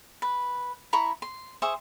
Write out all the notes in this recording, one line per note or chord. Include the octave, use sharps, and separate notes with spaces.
B4
E4 A#5 B5 C#6
C6
G#4 C5 E5 C#6